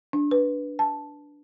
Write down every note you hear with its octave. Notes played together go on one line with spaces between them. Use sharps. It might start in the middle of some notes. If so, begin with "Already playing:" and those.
D4
B4
A5